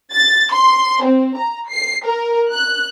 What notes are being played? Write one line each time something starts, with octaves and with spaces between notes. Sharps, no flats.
A6
C6
C4
A#5
C7
A#4
F#6